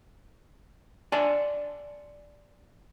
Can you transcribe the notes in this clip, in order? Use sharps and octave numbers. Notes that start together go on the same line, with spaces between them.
D5 G#5 A5 C6